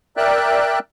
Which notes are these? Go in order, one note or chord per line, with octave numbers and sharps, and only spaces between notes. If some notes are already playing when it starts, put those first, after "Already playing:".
A#4 D5 E5 G5 F#6